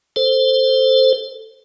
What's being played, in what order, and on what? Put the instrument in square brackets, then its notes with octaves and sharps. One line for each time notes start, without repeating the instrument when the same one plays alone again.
[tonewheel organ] A4 C5